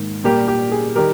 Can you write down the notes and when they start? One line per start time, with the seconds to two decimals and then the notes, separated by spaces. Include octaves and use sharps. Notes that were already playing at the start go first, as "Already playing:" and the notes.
Already playing: G#2 D#3 A#3
0.24 A#2 G3 A#3 G4 A#4
0.48 G4
0.72 G#4
0.95 D#3 G3 G4 A#4